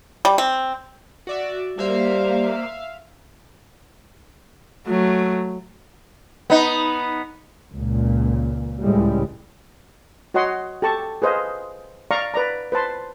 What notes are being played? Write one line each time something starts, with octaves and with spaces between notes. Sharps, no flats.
G3
C4
F#4 D5 E5
G3 A#3 C5 E5 F5
F#3 A3
B3 D#4
C#2 A#2
C#2 A2 G3 G#3
F#4 C#5 D#5 F#5 C6
G4 A4 A5 C#6
G#4 B4 C5 D#5 F5
D5 F5 A#5 C#6
B4 D5 A#5
B4 C5 A5 C6